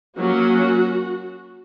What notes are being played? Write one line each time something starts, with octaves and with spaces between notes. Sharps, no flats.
F#3 A#3 C#4 F#4